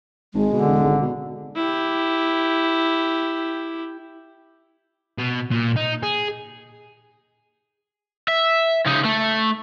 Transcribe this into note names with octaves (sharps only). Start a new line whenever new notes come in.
G#1 G#3
B2 D3
E1
G#1
B2
E4 G4
B2
A#2
D#4
G#4
E5
C#3 D#4
A3